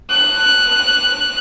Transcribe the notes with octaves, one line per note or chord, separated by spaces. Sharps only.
F#6